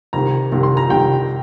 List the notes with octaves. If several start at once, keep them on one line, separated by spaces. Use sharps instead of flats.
C2 C3 D#3 G3 A#5
C2 C3 D#3 G3
C6
A#5
C2 C3 D#3 G3 G5